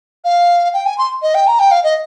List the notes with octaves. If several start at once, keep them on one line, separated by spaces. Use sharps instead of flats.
F5
G5
G#5
C6
D#5
G5
A#5
G5
F5
D#5